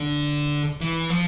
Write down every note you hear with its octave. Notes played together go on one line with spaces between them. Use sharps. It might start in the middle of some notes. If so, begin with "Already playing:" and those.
Already playing: D3
E3
F3